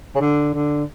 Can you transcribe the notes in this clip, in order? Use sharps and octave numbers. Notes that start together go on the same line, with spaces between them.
C#3
D3
D3